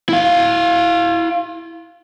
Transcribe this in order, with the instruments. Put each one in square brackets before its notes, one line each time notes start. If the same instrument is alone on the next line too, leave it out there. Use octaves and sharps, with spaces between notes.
[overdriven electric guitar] E4 F5